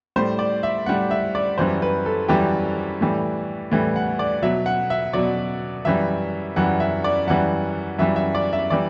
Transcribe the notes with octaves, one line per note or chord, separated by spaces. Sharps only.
A2 G3 C5
D5
E5
A2 G3 F#5
E5
D5
F#2 E3 G3 C5
B4
A4
F#2 E3 G3 G4
A2 E3 G3
A2 E3 G3
F#5
D5
B2 F#3 E5
F#5
E5
B2 F#3 D5
F#2 E3 G3 E5
F#2 E3 G3 F#5
E5
D5
F#2 E3 G3 F#5
F#2 E3 G3 E5
E5
D5
E5
E3 G3 D5